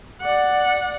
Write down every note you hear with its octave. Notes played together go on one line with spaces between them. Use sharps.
D5 F#5